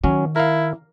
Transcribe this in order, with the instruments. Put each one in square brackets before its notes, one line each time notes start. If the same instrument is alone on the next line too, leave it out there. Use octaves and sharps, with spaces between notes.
[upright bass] D#3 [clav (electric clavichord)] F#3 C#4
[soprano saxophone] E4 [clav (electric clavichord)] A#4 F5